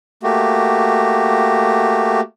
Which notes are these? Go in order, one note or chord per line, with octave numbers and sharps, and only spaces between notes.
A3 A#3 F#4 G4